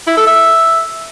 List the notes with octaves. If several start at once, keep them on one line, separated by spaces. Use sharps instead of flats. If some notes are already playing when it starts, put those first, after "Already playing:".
E4
A4
E5